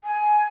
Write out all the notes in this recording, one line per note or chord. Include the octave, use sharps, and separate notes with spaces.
G#5